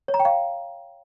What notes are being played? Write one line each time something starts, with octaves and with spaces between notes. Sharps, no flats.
C#5
A#5
G5
F5